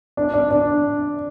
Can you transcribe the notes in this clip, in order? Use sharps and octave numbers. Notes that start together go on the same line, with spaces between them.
D4
D4
D4